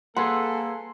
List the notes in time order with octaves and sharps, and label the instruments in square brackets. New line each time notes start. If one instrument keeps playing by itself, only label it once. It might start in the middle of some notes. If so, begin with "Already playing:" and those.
[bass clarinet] A#3 [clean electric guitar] G#4 B4 F#5 [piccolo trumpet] A4 [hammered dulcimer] C6